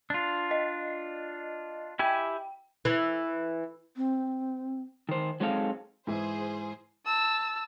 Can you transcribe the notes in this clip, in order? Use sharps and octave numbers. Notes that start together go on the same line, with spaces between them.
D4 F4
D#5
E4 G4 G5 G#5
E3
C4
D#3 C5
F#3 G#3 C4 D#4 A4 F5
G#2 E3 G#4 C5 G#5
A5 E6